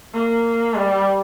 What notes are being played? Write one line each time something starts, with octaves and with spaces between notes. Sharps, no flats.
A#3
G3